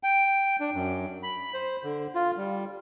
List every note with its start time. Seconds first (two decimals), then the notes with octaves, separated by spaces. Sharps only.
0.03 G5
0.60 D4
0.74 F#2
1.23 B5
1.54 C5
1.84 D3
2.15 F4
2.37 G3